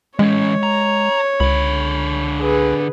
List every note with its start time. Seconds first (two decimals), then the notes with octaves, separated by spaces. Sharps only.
0.19 E3 G#3 C#4 C#5
0.63 A#5
1.40 C#2 D3 B5
2.38 G#4 B4